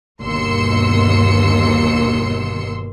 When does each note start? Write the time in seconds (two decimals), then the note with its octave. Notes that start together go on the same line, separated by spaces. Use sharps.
0.22 G1 D#2 B2 C6 E6 C#7